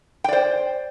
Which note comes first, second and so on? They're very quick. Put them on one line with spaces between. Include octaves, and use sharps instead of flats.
G5 D5 C5